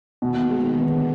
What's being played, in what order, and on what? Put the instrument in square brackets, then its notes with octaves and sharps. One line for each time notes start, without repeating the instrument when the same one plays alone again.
[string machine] D#2 D#3 [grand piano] B2
[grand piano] G#3
[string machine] D3 [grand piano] B3